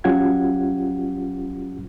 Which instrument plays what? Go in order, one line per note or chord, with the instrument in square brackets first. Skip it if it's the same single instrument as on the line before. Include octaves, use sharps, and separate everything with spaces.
[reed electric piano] F#3 C#4 F4 G4 F#5 G#6